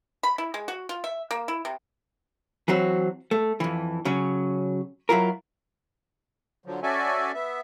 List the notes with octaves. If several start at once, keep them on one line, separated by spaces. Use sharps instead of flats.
B5
E4
G#3
F#4
F4
E5
A#3
E4
C3
E3 F#3 C4 F#4
A3
F2 E3
C#3 F#3 C#4
F#3 E4 F4 A#4
D3 F3 F#3
C#4 F#4 A4 D5 E5 G#5
B3 E5